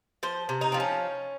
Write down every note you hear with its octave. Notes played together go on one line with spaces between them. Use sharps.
F3 C5
C3
D#4
F3 C4
C#4